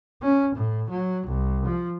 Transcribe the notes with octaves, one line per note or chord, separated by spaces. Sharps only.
C#4
A2
F#3
C2
F3